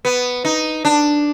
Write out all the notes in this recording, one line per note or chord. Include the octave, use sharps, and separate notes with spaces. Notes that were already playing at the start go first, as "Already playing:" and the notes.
B3
D#4
D4